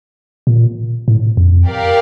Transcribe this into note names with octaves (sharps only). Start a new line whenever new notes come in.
A#2
A2
F2
G4 A#4 D5 F5